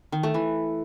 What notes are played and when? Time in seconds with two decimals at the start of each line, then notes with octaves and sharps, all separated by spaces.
0.12 D#3
0.23 A3
0.34 E3